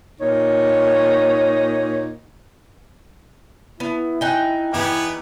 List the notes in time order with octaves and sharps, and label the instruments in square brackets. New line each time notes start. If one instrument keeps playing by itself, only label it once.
[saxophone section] A#2 D#4 C#5
[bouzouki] B3 [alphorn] E4
[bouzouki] D#4 G5 [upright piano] G#5 F#6
[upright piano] E2 [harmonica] B3 G4 G#5 [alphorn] E4